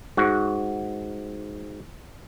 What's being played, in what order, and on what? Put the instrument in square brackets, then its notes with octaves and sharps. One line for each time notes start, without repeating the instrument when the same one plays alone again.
[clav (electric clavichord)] G#2 F#4